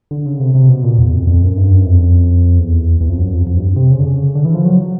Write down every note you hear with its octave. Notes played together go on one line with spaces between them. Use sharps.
D3
C#3
C3
C3
B2
A#2
E2
F2
F2
F#2
G2
F#2
F2
E2
E2
F2
F#2
F2
F2
G2
C3
C#3
D3
C#3
D3
E3
F3
F#3